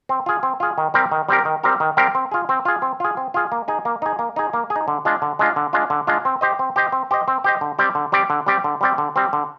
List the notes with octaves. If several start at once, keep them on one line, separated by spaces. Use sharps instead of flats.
C4
F4 G#4
C4
F4 G#4
D#3
G3 C4 G4 A#4
D#3
G3 C4 G4 A#4
D#3
G3 C4 G4 A#4
D#3
G3 C4 G4 A#4
C4
F4 G#4
C4
F4 G#4
C4
F4 G#4
C4
F4 G#4
A#3
D#4 G#4
A#3
D#4 G#4
A#3
D#4 G#4
A#3
G#4
D#4
D3
G#3 D4 F4
D3
G#3 D4 F4
D3
G#3 D4 F4
D3
G#3 D4 F4
C4
G4 C5 D#5
C4
G4 C5 D#5
C4
G4 C5 D#5
C4
G4 C5 D#5
D3
G3 C4 G4 D5
D3
G3 C4 G4 D5
D3
G3 C4 G4 D5
D3
G3 C4 G4 D5
D3
G3 C4
D3